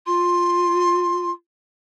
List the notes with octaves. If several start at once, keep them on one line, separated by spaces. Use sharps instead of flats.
F4 C6